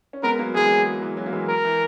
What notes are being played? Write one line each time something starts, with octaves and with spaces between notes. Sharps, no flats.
C#4
G#3 B3 A#4
F#3 A#3
E3 G#3 G#4
G#3
F#3
E3
F#3
A#3
E3 G#3
A#4
E3